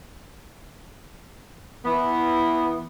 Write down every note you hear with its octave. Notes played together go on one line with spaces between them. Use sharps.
E3 B3